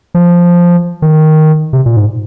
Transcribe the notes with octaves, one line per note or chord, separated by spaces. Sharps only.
F3
D#3
C3
A#2
G#2